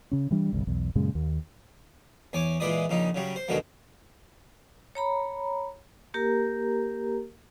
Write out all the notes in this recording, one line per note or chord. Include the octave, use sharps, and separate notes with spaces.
C#3 C#4
E3 G3 D4
G1 C2
B1 E2
F#2 A#2 C#3 G#3
D#2
E2 C#5 G#5 D6
A#2 E3 G#3 D5 B5 D#6
A#1 C#3 D#4
C#3 F#3 G3
C5
D#2 B2 D3 F#3 G#3 A#3
C#5 A#5 B5
A#3 G4 A#4 A#5